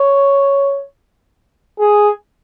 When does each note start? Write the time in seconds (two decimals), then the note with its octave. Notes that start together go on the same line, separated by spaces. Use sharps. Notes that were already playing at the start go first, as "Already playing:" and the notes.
Already playing: C#5
1.80 G#4